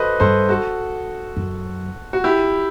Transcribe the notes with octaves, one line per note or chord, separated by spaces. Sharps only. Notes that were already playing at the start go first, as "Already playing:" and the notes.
Already playing: F#4 A4 B4 C5 D#5
G2 A4 C5
F#4 A4
F#2
F#4
E4 G4